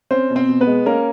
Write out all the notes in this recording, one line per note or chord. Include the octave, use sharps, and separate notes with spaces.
C4 C#4 C5
B2
C4 C5
B2
B3 B4
G#3
A#3 C#4 A#4